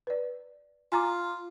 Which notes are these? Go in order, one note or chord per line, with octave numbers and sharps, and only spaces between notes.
B4 D5
F4 G#5 A#5 D6